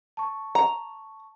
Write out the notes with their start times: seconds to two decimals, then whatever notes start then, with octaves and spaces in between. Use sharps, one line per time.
0.17 A5 C#6
0.55 A#5